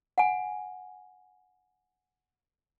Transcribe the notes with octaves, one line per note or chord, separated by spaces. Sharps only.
F#5 G#5